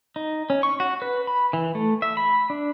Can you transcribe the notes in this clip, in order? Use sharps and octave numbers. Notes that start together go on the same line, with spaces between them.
D#4
C#4
C#6
F#4
B4
B5
E3
A3
E5
B5
D4